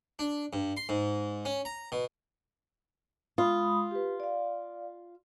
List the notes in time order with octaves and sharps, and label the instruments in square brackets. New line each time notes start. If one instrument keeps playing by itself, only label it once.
[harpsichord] D4
G2
C6
G#2
C#4
A#5
B2
[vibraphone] G#3 B5 D#6 [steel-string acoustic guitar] F4
[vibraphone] G4 B4
D5 F5